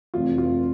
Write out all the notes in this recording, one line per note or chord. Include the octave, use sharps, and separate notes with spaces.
F1 F2 E3 A3 F4
F4